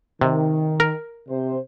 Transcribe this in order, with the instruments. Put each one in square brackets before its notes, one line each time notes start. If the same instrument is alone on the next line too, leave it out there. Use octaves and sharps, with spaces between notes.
[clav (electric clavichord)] C3 [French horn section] D#3
[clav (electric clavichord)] A#4
[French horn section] C3 C5